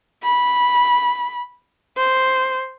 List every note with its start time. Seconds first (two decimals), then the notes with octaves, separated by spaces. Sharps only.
0.23 B5
1.97 C5